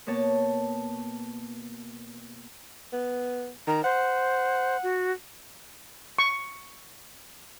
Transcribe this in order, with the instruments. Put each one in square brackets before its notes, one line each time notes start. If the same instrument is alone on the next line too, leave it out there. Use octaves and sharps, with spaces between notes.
[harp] B2 A#3 C#5 A5
[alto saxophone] B3
[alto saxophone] D#3 [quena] A#5
[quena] C5 [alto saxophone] F#5
[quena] F#4
[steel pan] C#6